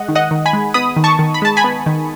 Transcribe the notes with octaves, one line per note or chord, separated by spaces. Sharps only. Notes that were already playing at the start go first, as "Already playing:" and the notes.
Already playing: G#3 D#5 F#5
D#3
D#5 F#5
D#3
G#5 B5
G#3
B3 B5 D#6
D#3
A5 C#6
D#3
B5
G#3 A5
G#5 B5
B3
D#3